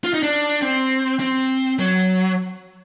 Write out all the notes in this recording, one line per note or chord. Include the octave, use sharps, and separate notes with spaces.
F4
D#4
D4
C4
C4
F#3